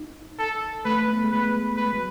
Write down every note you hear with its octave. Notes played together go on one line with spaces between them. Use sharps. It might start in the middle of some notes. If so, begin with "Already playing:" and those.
Already playing: D#4
A4
A3 B4
B3
G#3
A3 B4
A3 B4
G#3
F#3